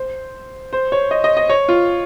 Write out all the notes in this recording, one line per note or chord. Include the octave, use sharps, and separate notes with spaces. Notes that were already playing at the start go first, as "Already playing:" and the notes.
Already playing: C5
C5
C#5
D#5
D#5
D#5
C#5
F4